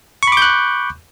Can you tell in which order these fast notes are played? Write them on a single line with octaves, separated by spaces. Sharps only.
C#6 B5 D6 G6 F#6